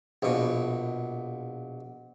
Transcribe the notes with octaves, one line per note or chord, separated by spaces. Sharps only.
A#1 B2